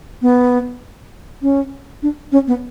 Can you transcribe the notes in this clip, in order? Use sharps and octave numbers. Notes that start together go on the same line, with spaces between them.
B3
C#4
D4
C#4
B3